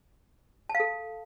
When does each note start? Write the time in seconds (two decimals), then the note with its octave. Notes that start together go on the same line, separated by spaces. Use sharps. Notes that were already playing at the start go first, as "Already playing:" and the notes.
0.69 A5
0.75 F5
0.80 A4